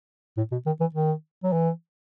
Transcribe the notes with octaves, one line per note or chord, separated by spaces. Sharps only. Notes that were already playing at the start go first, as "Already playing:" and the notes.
A2
B2
D#3
E3
D#3
F#3
E3